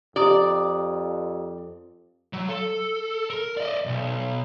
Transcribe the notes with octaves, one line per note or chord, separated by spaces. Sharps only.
F2 G4 D5 A#5 D#6
F#3
A4
A#4
D5 D#5
B1